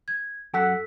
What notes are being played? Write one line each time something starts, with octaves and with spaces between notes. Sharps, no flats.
G#6
F#2 F#4 A4 F#5 E6 B6